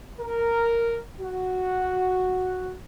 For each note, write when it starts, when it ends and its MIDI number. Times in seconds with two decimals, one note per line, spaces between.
0.20 0.97 70
1.21 2.74 66